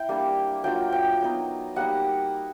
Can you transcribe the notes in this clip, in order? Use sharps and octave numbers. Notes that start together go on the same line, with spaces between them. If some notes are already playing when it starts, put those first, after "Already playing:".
Already playing: E4 G5
G3 A#3 D4
F#3 A#3 D4 F4 G5
G5
F#3 B3 D#4
G3 A#3 D#4 F#5